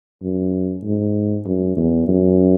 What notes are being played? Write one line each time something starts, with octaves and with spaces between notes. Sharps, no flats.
F#2
G#2
F#2
E2
F#2